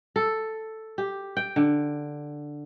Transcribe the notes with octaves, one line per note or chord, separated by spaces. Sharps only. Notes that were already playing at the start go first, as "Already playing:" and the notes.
A4
G4
G5
D3